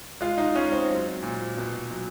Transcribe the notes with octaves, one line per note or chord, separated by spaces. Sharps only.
G#3 F4
D#4
G#3 C#4
C4
F#3
A#2
B2
F#3